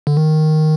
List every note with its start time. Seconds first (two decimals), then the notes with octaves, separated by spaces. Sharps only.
0.07 D3
0.17 D#3